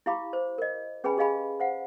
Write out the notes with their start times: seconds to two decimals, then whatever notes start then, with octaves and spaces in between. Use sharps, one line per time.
0.06 E4 G4 F5 B5 D6
0.33 C5
0.58 A#4 D#5
1.04 C#4 G#4 B4 G5 G#5 B5
1.17 G4 G#4 D#5 F5 G#5 B5
1.60 C5 F5 F#5